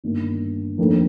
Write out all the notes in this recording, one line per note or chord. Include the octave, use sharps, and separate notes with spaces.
G1 G2 D#3 A#3
F1 F2 D#3 A#3 D4